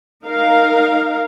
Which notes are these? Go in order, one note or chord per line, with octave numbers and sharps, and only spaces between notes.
D#4 A#4 F5